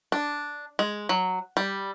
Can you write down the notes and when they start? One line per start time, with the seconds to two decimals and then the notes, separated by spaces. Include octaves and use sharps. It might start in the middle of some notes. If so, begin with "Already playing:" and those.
0.12 D4
0.79 G#3
1.09 F#3
1.57 G3